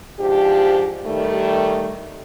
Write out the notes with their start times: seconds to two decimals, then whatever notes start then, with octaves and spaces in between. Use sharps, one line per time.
0.20 G#2 F3 D4 G4
1.05 D#3 G3 A3